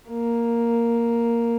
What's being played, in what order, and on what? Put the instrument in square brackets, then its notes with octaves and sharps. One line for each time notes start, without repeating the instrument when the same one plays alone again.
[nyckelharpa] A#3